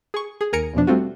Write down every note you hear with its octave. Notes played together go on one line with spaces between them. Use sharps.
G#4 C#6
G#4
D#2 A#4 G#5 A#5 C#7 D7
E2 B2 F3 D4
G3 A3 C4 F4 F#4